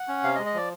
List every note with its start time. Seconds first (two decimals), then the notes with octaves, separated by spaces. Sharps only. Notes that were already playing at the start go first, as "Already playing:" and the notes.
Already playing: F#5
0.08 C#4
0.23 C3 F5
0.35 D#5
0.38 G#3
0.46 D#5
0.54 F3 D5